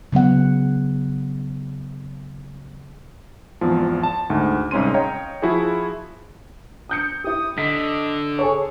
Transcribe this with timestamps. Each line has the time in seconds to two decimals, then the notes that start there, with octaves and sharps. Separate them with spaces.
0.12 C#3 F#3 B3 F#5
3.61 G#1 E2 F3
4.03 A5
4.30 D2 G#2
4.71 C2 G#2 C#4 C6 D#7
4.94 C#5 D#5 F5 G5 A#5
5.42 F3 E4 F#4 G#4
6.89 D#6 G6 C#7
7.24 E4 G4 D#6
7.58 D3 D#5 B6
8.39 G#4 A4 C#5 C#6